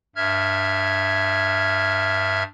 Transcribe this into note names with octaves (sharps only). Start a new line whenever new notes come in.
G2 E5 F6 G#6